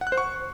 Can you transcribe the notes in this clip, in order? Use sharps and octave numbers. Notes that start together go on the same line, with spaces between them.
F#5
F#6
C5
C#6